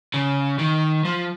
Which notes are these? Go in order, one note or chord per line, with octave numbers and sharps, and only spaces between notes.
C#3
D#3
F3